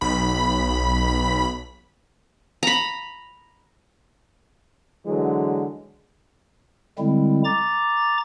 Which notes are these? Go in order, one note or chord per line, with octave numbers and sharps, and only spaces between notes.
B1 B5 B6
A#5 B5
D3 E3 F#3 G#3
D3 G3 G#3 C4 E4
A#5 D6 A6